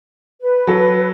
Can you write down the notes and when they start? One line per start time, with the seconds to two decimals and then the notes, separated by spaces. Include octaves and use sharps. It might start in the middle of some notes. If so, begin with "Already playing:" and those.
0.41 B4
0.67 F#3 A4